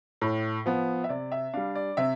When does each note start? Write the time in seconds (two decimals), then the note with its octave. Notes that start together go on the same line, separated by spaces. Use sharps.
0.21 A2
0.66 F3 B3
1.04 E5
1.09 C3 D5
1.32 E5
1.54 G3 D4 F5
1.75 D5
1.97 C3 E5